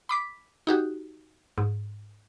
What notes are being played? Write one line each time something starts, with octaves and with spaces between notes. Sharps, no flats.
B5 D6 B6
D#4 F#4 G4
G#2